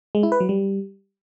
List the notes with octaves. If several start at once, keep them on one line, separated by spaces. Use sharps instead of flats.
G#3
E4
B4
F#3
G3